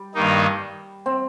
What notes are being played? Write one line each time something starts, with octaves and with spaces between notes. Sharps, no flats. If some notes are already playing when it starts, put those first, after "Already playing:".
Already playing: G3
G2 D#3 A#3 D#4
C4